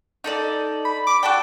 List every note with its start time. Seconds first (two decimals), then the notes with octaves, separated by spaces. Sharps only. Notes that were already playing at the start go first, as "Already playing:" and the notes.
0.24 D#4 A4 D5
0.85 B5
1.07 D6
1.23 F#4 A4 D5 G5